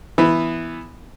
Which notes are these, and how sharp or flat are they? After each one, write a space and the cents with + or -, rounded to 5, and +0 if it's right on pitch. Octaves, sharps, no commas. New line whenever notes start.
E3 +0 B3 +0 B4 +0